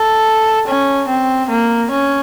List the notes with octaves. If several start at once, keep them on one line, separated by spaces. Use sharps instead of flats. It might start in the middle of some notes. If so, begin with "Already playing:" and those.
Already playing: A4
C#4
C4
A#3
C#4